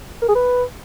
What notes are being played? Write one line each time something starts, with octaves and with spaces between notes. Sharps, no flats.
A#4
G#4
B4